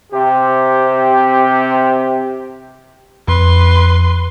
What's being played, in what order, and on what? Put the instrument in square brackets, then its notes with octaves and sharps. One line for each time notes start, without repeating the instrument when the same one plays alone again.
[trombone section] C3 G4
[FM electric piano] F2 [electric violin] B4 C6